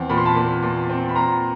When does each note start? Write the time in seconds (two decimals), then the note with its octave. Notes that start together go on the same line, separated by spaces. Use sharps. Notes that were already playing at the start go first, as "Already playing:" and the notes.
Already playing: E2 C4
0.09 A#2 B5
0.18 C6
0.25 A5 B5
0.36 A#2
0.62 A#2
0.89 C4
1.09 B5
1.15 A#2 A#5 C6